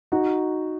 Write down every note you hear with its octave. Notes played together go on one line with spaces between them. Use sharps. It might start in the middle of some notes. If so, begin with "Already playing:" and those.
D#4 F#4